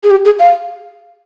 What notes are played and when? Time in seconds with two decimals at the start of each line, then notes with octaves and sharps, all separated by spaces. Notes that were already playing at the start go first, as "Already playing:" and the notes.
0.04 G#4
0.11 G4
0.25 G#4
0.39 F5